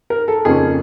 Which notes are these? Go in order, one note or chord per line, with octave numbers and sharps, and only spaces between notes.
A#4
A4
F2 C#3 F3 A#3 C#4 G#4